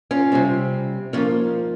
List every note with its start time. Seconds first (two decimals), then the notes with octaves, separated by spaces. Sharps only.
0.11 C#4 F4
0.32 C3 G3 C4
1.13 G#2 F3 A#3 C#4 F4